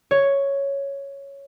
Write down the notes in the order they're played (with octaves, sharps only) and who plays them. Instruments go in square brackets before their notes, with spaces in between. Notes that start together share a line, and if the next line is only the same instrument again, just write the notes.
[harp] C#5